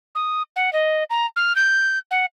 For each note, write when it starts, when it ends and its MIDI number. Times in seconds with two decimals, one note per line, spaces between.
0.15 0.42 87
0.56 0.72 78
0.73 1.04 75
1.10 1.26 82
1.36 1.55 89
1.56 1.99 91
2.11 2.25 78